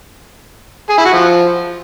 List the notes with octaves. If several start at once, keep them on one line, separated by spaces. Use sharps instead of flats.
G#4
E4
F#4
F3